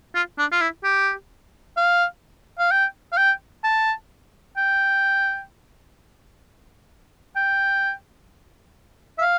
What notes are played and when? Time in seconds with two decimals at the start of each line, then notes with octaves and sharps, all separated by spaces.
0.15 F4
0.38 D4
0.52 F4
0.61 E4
0.84 G4
1.77 F5
2.59 F5
2.71 G5
3.12 F5
3.17 G5
3.64 A5
4.57 G5
7.36 G5
9.18 E5
9.22 F5